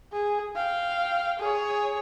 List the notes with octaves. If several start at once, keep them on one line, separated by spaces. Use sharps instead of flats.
G#4
F5 G5
G#4 C#5